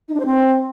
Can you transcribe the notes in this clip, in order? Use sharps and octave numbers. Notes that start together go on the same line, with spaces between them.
D#4
D4
C5
C4